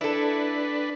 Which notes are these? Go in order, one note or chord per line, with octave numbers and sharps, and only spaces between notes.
D4 E4 A4 B4